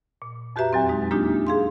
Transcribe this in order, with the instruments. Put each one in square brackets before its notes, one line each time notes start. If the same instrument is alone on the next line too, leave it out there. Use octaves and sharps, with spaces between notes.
[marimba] A#2
F2 F#4 G4 B4 E5 A#5
E2 F#3 C4
G#3 D#4
G#3 A#3 D4 D#4 F4 G4
G#4 F5 C6